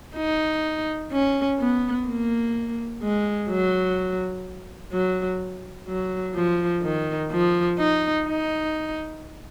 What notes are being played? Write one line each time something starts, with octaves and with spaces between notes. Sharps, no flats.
D#4
C#4
B3
A#3
G#3
F#3
F#3
F#3
F3
D#3
F3
D#4
D#4